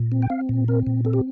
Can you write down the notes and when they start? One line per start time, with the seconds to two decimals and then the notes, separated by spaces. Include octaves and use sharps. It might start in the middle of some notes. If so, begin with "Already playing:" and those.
Already playing: A#2
0.12 C4
0.22 G5
0.30 C4 F5
0.49 A#2
0.68 C4 A#4
0.87 A#2
1.05 C4 A4
1.13 G4